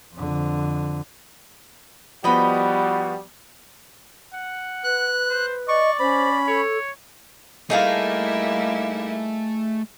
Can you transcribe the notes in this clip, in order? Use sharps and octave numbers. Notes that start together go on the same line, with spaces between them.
F2 D3
F3 G3 B3 F#4 D#5 B5
F#5
B4 F#6
C5
D5 D#5 C#6
C#4 C5 B5
A4 C#5
G3 A3 A#3 D#4 E4 G#4 F5